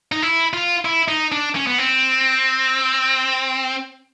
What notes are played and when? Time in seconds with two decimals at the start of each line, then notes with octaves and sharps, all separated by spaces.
0.12 D#4
0.22 E4
0.53 F4
0.85 E4
1.08 D#4
1.32 D4
1.56 C#4
1.67 B3
1.78 C4